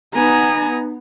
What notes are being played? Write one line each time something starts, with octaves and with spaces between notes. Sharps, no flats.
B3 D#4 G#5 A#5